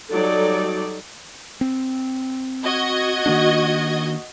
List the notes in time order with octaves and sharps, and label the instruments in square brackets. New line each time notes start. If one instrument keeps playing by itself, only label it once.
[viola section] F#3 G3 D#4 A4 D5
[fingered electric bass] C4
[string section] F#4 D#5 G#6
[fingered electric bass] D#3 A#3 D4